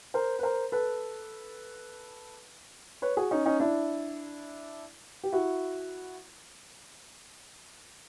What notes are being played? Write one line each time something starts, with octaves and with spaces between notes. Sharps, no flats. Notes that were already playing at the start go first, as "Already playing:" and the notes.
A#4 C5
B4
A#4 C5
A4 B4
B4 C#5
F#4 G#4
C#4 D#4
C#4 D#4
D4 E4
G4
E4 F#4